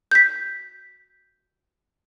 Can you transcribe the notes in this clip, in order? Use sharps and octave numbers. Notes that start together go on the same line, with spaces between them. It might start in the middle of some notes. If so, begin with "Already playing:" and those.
G6 B6